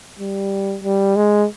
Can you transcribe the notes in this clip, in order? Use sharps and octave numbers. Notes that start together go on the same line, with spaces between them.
G3
G3
G#3